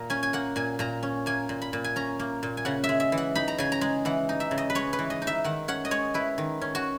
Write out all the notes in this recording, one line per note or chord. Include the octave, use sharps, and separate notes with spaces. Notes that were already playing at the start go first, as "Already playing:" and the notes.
Already playing: A#2 A#5
C#4 G#5
G#5
A#3 F#5
A#2 G#5
A#2 A#5
C#4
A#3 G#5
A#2
B5
A#2
G#5
C#4 A#5
A#3
A#2
G#5
C#3 F#5
E5
G#3
E5
E3
F#5
D#4 B5
A#5
C#3 G#5
A#5
G#3
E3 F#5
D#4
E5
C#3
D#5
B4
G#3 C#5
B4
E3
D#5
D#4
E5
D#3 F#5
C#4 F#5
D#5
G#3 C#5
E4 B4
D#3
C#4
F#4